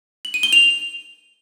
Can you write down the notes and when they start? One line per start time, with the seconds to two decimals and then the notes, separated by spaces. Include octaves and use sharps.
0.25 F#7
0.34 D#7
0.43 G7
0.53 F7